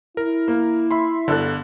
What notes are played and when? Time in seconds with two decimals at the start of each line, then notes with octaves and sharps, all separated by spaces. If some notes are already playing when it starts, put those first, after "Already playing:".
0.17 E4 A#4
0.48 A#3
0.91 E5 B5 C6
1.28 G1 D3 A4 F#6